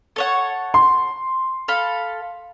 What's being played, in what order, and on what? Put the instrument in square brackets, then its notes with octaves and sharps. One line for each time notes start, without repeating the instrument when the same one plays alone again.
[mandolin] A4 C#5 F#5
[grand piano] C6
[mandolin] A4 F5 B5